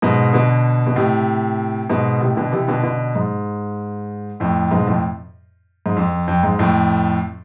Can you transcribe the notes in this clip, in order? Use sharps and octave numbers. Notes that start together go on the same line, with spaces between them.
G#2 B2
B2 D3
B2
A2 C3
G#2 B2
A2 C3
B2 D3
C3 E3
B2 D3
B2 D3
G#2
F2 A2
G#2 B2
F2 A2
G#2
F2
F2
G#2
F2 A2